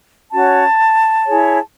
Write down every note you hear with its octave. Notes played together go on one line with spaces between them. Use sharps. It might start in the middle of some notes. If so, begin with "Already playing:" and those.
C#4 F#4 C#5 A5
E4 G#4 C#5